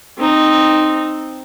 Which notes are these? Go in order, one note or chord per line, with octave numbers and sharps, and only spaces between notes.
C4 D#4